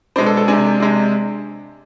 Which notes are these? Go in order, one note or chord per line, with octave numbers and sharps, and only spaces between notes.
B2 G#3 D4 C5
A4
A4
C3 G#3 D4 G#5
C3 G#3 D4